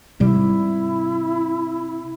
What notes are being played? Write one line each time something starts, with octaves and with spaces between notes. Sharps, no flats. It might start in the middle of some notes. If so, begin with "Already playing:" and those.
G#2 C3 G3 E4